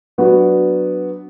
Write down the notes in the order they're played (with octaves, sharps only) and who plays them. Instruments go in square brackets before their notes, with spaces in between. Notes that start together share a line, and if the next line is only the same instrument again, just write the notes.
[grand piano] F#3 B3 D4 F#4